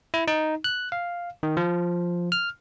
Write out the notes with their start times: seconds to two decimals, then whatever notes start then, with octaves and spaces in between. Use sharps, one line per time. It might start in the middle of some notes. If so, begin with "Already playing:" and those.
0.14 E4
0.28 D#4
0.64 F#6
0.92 F5
1.43 D#3
1.57 F3
2.32 F6